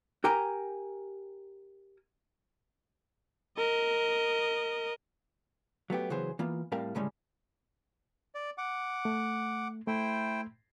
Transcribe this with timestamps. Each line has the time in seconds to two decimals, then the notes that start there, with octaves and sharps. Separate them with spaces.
0.24 G4 A#4 G5 G#5 A#5
3.57 A#4 D#5
5.90 F#3 A3 B3 G4
6.10 C#3 E3 F#3 B3 G#4 C5
6.39 E3 A#3 B3 F4
6.72 A2 G3 C4 A#4 F5 A5
6.95 D2 A2 C#3 G3 G#3 C#4
8.35 D5
8.58 F#5 D6
9.05 A3
9.87 A3 E4 C5 G5